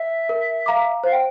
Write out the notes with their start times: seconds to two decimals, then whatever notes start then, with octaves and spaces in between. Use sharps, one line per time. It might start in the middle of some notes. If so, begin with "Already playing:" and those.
Already playing: E5
0.29 A#4
0.66 F5 A#5 D6
1.03 C5 F5
1.12 G5